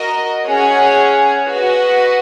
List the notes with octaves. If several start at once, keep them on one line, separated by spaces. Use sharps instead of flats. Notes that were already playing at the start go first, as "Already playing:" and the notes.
Already playing: F#4 A#4 D#5
C#4 G#4 C#5 F#5
F#4 B4 D#5 F#5